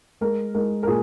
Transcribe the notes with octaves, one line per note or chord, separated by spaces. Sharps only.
G#3 A#4
G#3 A#4
A#4
A#2 G#4